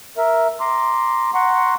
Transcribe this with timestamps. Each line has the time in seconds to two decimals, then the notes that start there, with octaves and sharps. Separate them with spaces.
0.17 A#4 E5
0.60 A#5 C6 D6
1.34 F#5 A#5 C6 C#6